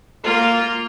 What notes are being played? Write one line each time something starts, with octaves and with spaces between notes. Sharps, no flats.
A#3 F4